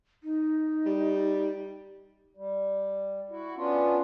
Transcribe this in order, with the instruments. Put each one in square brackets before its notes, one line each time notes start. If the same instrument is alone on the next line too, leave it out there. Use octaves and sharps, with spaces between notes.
[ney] D#4
[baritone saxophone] G3
[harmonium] G3
E4 F#4
B3 C#4 D4 F4